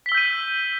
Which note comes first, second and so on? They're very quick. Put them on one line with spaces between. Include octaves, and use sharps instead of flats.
B6 G7 E6 G6 D#7